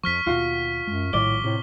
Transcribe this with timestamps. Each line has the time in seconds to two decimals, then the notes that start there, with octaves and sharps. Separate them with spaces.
0.04 F2 F3 C#6 F6 B6
0.26 D#2 B2 F4 F#4
0.87 F#2 G#3
1.13 A#1 A2 D#3 G3 D5 G7
1.44 A2 C3